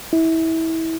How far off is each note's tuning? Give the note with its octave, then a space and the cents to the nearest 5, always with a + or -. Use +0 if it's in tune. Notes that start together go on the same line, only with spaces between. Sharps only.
E4 -25